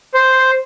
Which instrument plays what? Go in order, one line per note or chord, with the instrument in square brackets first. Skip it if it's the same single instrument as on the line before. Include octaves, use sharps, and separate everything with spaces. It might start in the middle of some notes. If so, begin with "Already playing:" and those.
[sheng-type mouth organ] C5